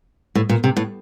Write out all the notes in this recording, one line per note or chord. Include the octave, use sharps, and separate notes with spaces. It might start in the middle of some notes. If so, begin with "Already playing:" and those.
A2
A#2
C3
A2